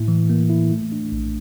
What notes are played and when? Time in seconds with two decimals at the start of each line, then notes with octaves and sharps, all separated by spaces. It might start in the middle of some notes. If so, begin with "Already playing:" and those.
Already playing: A2 A#3 E4
0.08 E3
0.29 A#3
0.50 E4
0.71 A3
0.92 D4
1.12 A#1